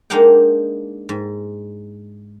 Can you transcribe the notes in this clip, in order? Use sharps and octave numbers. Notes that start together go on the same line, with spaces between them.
G#3 A#3 D4 D#4 F#5 G5
G#2